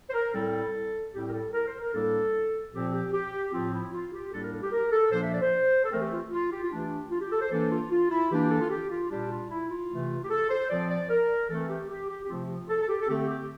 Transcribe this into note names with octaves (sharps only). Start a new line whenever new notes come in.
C5
A#4
A2 G3 C4 A4
A2 G3 C4 G4
A#4
A4
A#4
C5
A#4
A2 G3 A#3 D4 A4
A#2 F3 C4 G4
G4
G4
A2 F3 C4 F4
E4
F4
G4
A2 G3 A#3 D4 A4
A#4
A4
G4
A#4
A4
A#2 F3 A#3 D4 C5
E5
D5
C5
A4
E3 A3 C4 A#4
G4
F4
F4
G4
F4
E3 A3 D4 G4
F4
G4
A4
C5
E3 A#3 D4 A4
F4
F4
E4
E3 A#3 D4 G4
A4
F4
G4
F4
A#2 G3 D4 G4
F4
E4
F4
C3 E3 A3
G4
A4
C5
A#2 F3 C4 D5
D5
A#4
E3 A3 C4 A4
G4
G4
G4
G4
C3 F3 A3 C4 F4
F4
A4
A4
G4
A4
D3 A3 C4 G4
G4